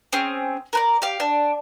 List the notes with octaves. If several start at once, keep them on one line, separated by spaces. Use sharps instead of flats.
C4 C#4 G#4
A#4 B4 D5
G4 F5
D4